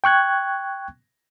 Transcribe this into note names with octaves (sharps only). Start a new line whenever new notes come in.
G5 C#6 F#6 G#6